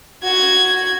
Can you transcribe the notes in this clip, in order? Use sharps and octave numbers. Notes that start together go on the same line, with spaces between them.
F#4 G#6